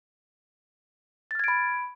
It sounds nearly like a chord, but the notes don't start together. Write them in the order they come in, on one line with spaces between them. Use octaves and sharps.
A6 F6 G#6 D7 B5